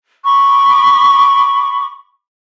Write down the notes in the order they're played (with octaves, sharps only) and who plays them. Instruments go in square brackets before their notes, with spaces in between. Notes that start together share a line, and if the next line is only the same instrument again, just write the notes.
[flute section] B5 C#6 D6